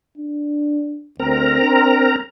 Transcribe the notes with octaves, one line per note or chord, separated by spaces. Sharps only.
D4
D2 C4 A#4 A#5
D4